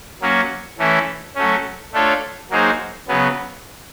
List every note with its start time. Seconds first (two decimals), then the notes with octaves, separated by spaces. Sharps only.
0.21 F#3 A#3 C#4 F#4
0.78 E3 A3 C#4 E4
1.35 F#3 A3 C#4
1.93 A3 D4 F4 A4 C#5
2.50 F#3 A#3 D#4 G#4 C5
3.08 C#3 F#3 B3